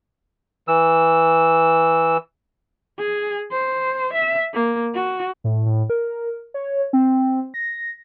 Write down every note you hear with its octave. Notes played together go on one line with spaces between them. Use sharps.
E3 E6
G#4
C5
E5
A#3
F#4
A2
A2
A#4
C#5
C4
A#6